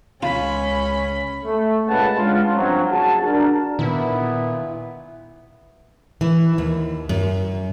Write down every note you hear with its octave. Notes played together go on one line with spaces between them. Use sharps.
C#2 C#3 C#4 F4 B5
A3
A#2 C#3 G#3 B4 F#5 A5
G#3 C#4 D4 F4
G2 C3 F3 F#3
F#1 F#4 G#4 A5
D4 A#4
A#2 D#3 B3 E4
E3
D#2
F#2